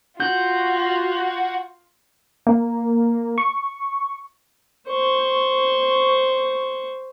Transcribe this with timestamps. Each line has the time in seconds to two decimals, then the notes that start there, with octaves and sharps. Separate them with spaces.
0.20 F4 F#4 G6
2.47 A#3
3.38 C#6
4.88 C5 C#6